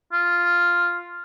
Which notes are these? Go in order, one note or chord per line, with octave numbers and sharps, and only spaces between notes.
F4